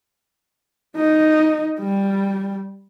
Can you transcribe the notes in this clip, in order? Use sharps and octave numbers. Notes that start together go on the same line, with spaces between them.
D#4
G3